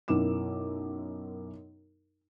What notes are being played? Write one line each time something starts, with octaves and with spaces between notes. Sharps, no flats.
B1 F#2 E4 A#4 D6 E7